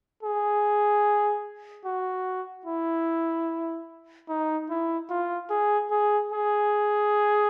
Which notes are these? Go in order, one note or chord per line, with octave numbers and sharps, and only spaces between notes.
G#4
F#4
E4
D#4
E4
F4
G#4
G#4
G#4